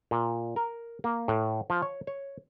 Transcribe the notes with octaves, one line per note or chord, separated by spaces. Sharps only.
A#2
A#4
A#3
A2
F3
C#5
C#5